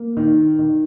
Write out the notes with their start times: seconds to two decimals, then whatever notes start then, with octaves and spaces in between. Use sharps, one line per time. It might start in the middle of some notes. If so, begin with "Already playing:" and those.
Already playing: A#3
0.17 D#3
0.59 D#3